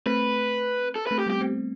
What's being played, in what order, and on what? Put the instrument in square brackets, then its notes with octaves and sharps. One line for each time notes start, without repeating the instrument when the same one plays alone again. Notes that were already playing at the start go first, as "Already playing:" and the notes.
[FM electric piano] A3 C4 [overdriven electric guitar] B4
[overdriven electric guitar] A4
[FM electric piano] A3 C4 [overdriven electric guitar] B4
[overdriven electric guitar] G4
[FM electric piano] G3 B3
[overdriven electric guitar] G4
[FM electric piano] A3 C4